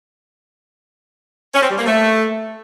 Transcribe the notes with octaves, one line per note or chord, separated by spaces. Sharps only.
C#4
C4
G3
A#3
A3